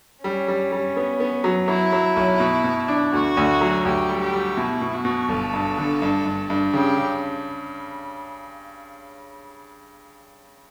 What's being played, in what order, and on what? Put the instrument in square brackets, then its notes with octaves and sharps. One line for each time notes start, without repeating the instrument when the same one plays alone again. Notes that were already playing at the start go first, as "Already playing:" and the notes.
[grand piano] G3 [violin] C#4
[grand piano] G3
G3
B3
B3
F#3
[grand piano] F#3 [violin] E4
[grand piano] F#3
B1
B2
B2
D4
[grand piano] D2 [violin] F#4
[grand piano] D2
F#3
[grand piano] D2 [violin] G4
[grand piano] G3
[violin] G4
[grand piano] G3
[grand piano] B2 [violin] E4
[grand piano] B2
[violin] F#4
[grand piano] B2
[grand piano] G1 [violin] A4
[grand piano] G2
D3
G2
G2
G2
[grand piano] C#3 [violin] G4
[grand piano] C#3